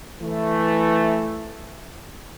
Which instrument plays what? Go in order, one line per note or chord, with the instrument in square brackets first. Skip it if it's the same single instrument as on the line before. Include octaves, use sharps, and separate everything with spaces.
[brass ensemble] E3 A3